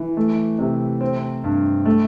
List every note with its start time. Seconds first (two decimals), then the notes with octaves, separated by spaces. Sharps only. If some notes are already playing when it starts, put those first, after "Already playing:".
Already playing: E3
0.17 A3
0.59 C3
1.01 C4
1.44 G2
1.85 A3